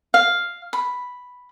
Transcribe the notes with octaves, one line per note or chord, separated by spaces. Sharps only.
F5
B5